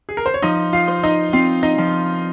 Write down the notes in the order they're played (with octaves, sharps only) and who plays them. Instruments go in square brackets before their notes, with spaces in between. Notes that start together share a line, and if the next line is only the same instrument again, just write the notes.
[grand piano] G#4
A#4
C5
C#5
[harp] F3 [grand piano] D#4 D#5
[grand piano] F4 F5
[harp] C5
[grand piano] D#4 D#5
[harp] C4 [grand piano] F4 F5
[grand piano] D#4 D#5
[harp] F3